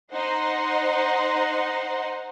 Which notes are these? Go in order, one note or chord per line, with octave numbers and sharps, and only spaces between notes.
D#4 C5 D#5 F#5 C6